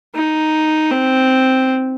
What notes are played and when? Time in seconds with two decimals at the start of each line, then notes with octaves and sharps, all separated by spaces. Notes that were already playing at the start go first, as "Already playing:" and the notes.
0.15 D#4
0.91 C4